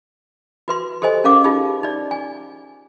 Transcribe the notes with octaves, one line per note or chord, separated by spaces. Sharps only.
F#4 B4 C6
G4 A4 C5 D#5 G#5
C#4 A#4 F5 D6
D#4 F4 G4 G#4
D#4 D5
G#5